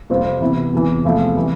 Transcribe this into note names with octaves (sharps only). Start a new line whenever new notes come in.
F2 C3 G3 C4 F4
C3 E3 B3 E4
E2 C3 E3
E2 C3 F3 A3 E4
E3 G3